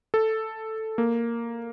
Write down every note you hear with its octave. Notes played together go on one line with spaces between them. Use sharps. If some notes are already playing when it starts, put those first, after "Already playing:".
A4
A#3